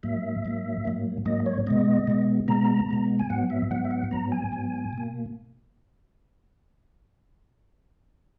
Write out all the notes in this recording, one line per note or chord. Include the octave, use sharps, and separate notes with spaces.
G#2 F#3 A#3 E5
G#2 F#3 A#3
G#2 F#3 A#3
G#2 F#3 A#3 D#5
C#5
B2 G#3 B3 D#5
B2 G#3 B3
B2 G#3 B3 A#5
B2 G#3 B3
G#5
G#2 F#3 B3 F#5
E5
G#2 F#3 B3 F#5
E5
F#5
G#2 F#3 B3 A#5
G#5
G#2 F#3 B3
B2 A#3